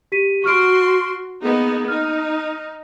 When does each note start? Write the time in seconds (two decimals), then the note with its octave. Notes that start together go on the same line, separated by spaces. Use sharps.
0.12 G4 B6 D#7
0.44 F#4 C6 C#6 F6 D7
1.42 A#3 B3 D#4 G#4
1.88 D#4 F6